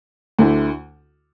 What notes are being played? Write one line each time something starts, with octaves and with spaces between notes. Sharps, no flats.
D2 D3 A3 E4